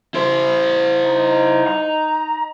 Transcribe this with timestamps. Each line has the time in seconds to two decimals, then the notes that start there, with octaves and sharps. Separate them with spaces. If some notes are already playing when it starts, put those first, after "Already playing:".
0.14 E4 C5
1.05 D#4
1.67 A#5